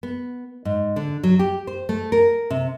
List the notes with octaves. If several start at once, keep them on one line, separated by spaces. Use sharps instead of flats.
B3
G#2
D3
F#3
G4
C5
A3
A#4
C3